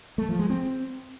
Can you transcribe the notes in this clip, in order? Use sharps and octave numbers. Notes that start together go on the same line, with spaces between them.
A3
F3
G#3
C4